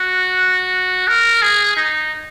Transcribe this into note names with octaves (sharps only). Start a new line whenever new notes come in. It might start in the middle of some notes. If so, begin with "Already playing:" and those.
Already playing: F#4
A#4
G#4
D#4